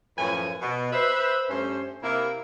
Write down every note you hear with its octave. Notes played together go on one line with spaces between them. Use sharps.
F#2 A2 F3 C#4 B4 G#5
B2
B4 C5 E5
G2 A3 C#4 C5
C3 A#3 E4